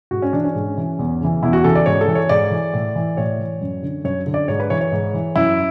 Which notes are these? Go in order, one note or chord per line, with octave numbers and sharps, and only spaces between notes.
G#2 F#4
C#4
E3 D4
C#4
G#2
E3
E2
C#3 E3
E2 E4
F#4
C#3 E3 A4
D5
G#2 C#5
A4
E3
C#5
G#2 D5
E3
A2
E3
A2 C#5
E3
F#2
D3
F#2 C#5
D3
D5
G#2 C#5
B4
E3 C#5
C#5
G#2
E3
F#2 E4